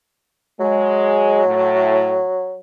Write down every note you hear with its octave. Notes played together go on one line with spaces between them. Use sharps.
F#3 G#3
A2